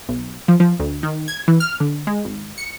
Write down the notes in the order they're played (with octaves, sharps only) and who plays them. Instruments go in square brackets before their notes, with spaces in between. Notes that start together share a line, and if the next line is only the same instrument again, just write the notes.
[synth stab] B1
F3
F3
D2
D#3
G#6
E3
F6
D3
G#3
G#1
C#7